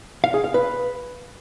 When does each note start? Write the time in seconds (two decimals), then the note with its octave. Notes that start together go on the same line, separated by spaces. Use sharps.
0.24 F5
0.34 G#4
0.44 F5
0.54 B4